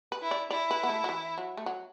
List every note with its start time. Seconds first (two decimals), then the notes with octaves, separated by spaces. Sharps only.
0.12 B4
0.22 E4
0.31 D5
0.51 E4 D5
0.71 B4
0.83 B3
0.89 A3
1.04 F#3
1.09 E3
1.38 F#3
1.57 A3
1.66 F#3